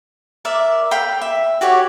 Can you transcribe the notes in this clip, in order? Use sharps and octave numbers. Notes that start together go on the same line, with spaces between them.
A#4 D5 E5
F5 G5 B5
E5
F#4 G4 C#5 D5